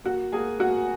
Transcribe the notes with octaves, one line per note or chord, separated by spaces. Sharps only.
A#3 F#4 F#5
A#3 G#4 G#5
A#3 F#4 F#5